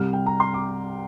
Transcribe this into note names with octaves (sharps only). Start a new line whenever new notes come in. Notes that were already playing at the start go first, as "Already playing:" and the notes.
Already playing: C2 C3 G3 F6
G5
A#5
C6
D6